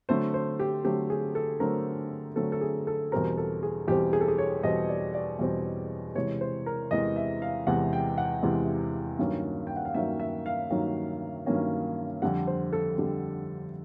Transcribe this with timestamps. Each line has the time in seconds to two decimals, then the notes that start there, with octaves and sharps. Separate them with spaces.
0.09 D3 F#3 A3 C4 C5
0.34 C5
0.60 G4
0.85 D3 F#3 A3 C4 G4
1.10 G#4
1.35 A4
1.60 D3 F#3 A3 C4 A#4
2.36 D3 F#3 A3 C4 A4
2.52 A4
2.61 G#4
2.87 A4
3.12 E2 B2 G3 C4 A#4
3.37 A4
3.63 G#4
3.88 E2 B2 G3 C4 G4
4.13 G#4
4.21 A4
4.28 G#4
4.38 C#5
4.63 E2 B2 G3 C4 D#5
4.89 D5
5.14 D5
5.39 E2 B2 G3 C4
6.15 E2 C3 E3 G#3 C#5
6.41 C5
6.66 A#4
6.91 E2 C3 E3 G#3 D#5
7.16 E5
7.42 F5
7.67 E2 C3 E3 G#3 F#5
7.93 G5
8.18 F#5
8.43 E2 C3 E3 G#3
9.19 G2 D#3 F#3 A#3 C#4
9.67 G5
9.76 F#5
9.85 F5
9.94 G2 D#3 F#3 A#3 C#4 E5
10.20 E5
10.46 F5
10.71 G2 D#3 F#3 A#3 C#4
11.46 G2 D#3 F#3 A#3 C#4
12.22 F2 D3 G3 F#5
12.47 C5
12.73 A4
12.98 F2 D3 G3